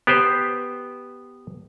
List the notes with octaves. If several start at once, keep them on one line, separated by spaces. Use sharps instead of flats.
B3 G4 B4 C5